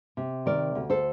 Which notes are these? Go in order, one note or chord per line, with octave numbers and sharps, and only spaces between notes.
C3
D#3 A#4 D5
D2
A4 C5